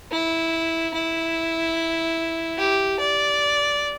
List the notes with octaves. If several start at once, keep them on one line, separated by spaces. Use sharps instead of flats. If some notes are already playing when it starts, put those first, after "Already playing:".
E4
E4
G4
D5